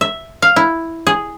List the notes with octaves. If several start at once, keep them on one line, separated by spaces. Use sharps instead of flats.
E5
F5
E4
G#4